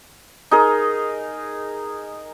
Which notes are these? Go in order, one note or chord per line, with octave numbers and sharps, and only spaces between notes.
D#4 G#4 A#4